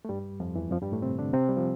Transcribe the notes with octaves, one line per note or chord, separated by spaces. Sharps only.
A3
G2 G3
F2 F3
E2 E3
F2 F3
G2 G3
A2 A3
C3 C4
D3 D4
C3 C4
G3
F3